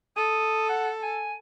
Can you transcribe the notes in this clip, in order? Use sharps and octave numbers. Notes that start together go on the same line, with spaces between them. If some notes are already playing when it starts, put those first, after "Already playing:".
A4 D#6
F#5
G#5